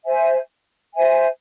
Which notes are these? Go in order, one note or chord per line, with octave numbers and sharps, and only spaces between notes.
C5 E5 G#5
C5 E5 G#5